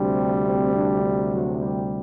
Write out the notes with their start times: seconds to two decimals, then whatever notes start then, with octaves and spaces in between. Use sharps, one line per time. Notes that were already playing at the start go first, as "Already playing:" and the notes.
Already playing: D2 C3 G3 C4 D4
0.44 C4
0.74 D4
1.30 F#3 F#4
1.59 G3 G4